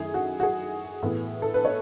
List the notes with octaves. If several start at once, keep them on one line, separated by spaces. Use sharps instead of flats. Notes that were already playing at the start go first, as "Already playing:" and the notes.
Already playing: F#2 D#3 A3 E4 G#4
F#4
F#4
G#4
A2 E3 B3
A4
B4
C#5